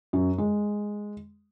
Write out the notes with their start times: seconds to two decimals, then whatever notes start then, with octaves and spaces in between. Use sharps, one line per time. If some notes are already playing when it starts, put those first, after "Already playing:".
0.13 F#2
0.38 G#3